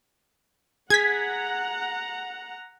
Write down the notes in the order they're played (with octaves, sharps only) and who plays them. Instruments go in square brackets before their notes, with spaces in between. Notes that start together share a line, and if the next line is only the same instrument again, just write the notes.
[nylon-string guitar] G#4 [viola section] F#5 A#5 [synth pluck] G#6 B6